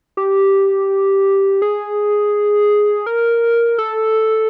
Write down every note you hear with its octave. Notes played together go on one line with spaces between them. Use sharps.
G4
G#4
A#4
A4